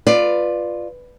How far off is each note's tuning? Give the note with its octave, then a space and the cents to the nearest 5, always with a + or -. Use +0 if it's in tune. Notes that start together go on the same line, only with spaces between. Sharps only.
F4 +0 B4 +0 D5 +15